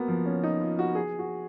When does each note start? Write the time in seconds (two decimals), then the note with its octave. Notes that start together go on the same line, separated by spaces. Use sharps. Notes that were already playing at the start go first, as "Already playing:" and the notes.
Already playing: A#3 B3 F#4
0.08 F3
0.26 C#4
0.43 D#4
0.61 F4
0.79 F#4
0.95 G#4
1.19 F#4